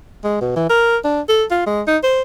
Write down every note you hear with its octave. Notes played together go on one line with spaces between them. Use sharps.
G#3
B2
E3
A#4
D4
A4
F4
G#3
D#4
C5